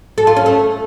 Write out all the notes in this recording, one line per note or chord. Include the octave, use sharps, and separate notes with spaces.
A4
F4
C#4
A3